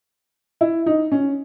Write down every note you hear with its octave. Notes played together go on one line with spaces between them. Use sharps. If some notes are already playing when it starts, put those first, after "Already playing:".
E4
D#4
C#4